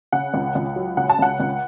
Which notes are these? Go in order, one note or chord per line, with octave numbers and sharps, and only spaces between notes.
C#3 F#5
C#2
C#2
F#3
C#3 F#5
A5
C#2 F#5
C#2